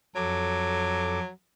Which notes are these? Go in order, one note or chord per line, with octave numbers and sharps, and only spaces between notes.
F2 F#3 A4 D6